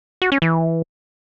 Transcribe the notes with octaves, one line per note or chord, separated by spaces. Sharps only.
F#4
C#4
E3